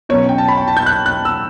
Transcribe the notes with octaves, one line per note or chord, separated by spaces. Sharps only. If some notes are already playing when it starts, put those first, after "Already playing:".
B2 F#3 C#4 C#5
G5
A5
B5
G5
A5
G6
F#6
F#6
E6